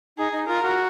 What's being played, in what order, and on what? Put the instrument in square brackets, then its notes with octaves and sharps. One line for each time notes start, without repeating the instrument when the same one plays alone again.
[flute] D#4 [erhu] G#4
[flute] D#4
[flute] F4 [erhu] A#4
[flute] F#4